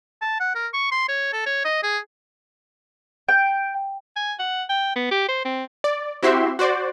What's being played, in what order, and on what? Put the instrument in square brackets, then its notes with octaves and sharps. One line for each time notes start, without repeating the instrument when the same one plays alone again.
[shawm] A5
F#5
A#4
C#6
C6
C#5
A4
C#5
D#5
G#4
[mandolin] G5
[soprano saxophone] G#5
F#5
G5
B3
G4
C5
C4
[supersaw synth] D5
C4 E4 F#4 G4 E5 C6
F#4 C5 D5